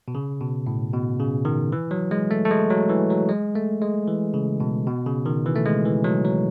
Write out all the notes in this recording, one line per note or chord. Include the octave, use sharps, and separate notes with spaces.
B2
C#3
B2
A2
B2
C#3
D#3
E3
F#3
G#3
A3
A3
G#3
F#3
E3
F#3
G#3
A3
G#3
E3
C#3
B2
B2
C#3
D#3
E3
A3
G#3
E3
F#3
F#3